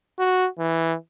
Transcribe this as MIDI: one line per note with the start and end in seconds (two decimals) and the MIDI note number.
0.19 0.47 66
0.58 0.95 52